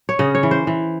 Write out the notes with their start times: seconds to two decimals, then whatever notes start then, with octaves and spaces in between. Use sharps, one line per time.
0.09 C#5
0.19 C#3 D#5
0.35 C#5
0.43 E3
0.51 C5
0.67 E3